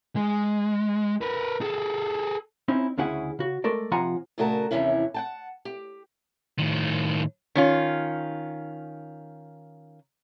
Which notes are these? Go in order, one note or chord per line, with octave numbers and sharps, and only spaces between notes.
G#3
A#4 B4
G#4 A4
C4 C#4 D#4 E4
D2 C#3 C#4 E4 G#4 F#5
C#3 F#4
G#3 A3 A4 A#4 D5
C3 F3 F4 F#5 G#5 A#5
A#2 C#3 A3 F#4 A#4 A5
D#2 A2 C3 E3 C#4 E4
F#5 G5 A5
G4
A2 D#3
D#3 C#4 F4